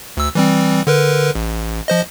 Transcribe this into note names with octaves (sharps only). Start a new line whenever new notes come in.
D2 E6
E3 G3 C4
D3 A#4 B4
A1
F3 C5 D#5